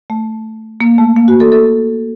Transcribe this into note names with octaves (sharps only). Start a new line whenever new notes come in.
A3
A#3
A3
A#3
F#4
A4
A4